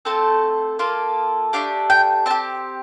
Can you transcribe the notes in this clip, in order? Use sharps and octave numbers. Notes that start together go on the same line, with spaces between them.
A3 C4 F4 A4 A5
A#3 F4 A4
A3 D4 G4 F5
G5
C4 G4 A5